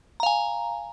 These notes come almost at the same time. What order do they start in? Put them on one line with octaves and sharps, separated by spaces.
A#5 F5 G#5